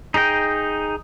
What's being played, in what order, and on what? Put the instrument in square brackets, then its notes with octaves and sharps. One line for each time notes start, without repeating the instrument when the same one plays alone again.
[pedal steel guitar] D#4 G#4 D#5 G5